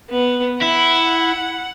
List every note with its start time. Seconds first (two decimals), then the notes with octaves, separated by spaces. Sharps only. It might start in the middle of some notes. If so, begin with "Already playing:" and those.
0.11 B3
0.62 E4 F#5